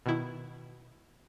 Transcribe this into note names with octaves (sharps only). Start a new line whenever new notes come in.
B2 D#3 E4